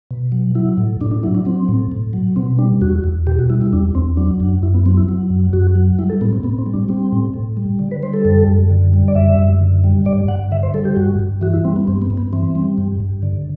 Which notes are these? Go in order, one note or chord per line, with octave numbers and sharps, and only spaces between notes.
B2
F#3
F#3 E4
A2
A2 D4
D4
F#3 E4
D4
F#3 C4
A2
A2
F#3
B2 C4
G3 D4
E2 F#4
E2
B2 G4
F#4
G3 E4
E4
E2 D4
E2 C4
F#3 D4
F#2
F#2 E4
B3
F#3 C4
E4
F#3
F#2
F#2 F#4
F#3
G3 E4
A4
A2 B3
C4
A2 B3
C4
G3
D4
G3 C4
A2
A2
G3
D3
B4
G3 C5
A4
F#2
F#2
D3
G3
D5
F#2 E5
F#2
D3
G3
G2 D5
G2 F#5
D3 E5
C5
G3 A4
G4
G2 F#4
G2
E3 F#4
E4
G3 C4
B3
G2 C4
B3
G2
B3
E3 C4
G3
G2
G2
D3